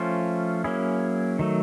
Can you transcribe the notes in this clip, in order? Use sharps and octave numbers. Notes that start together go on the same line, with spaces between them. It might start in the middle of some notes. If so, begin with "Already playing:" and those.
Already playing: F3 A3 C#4 F4
F#3 A#3 C#4 E4 G#4
D#3 F#3 A3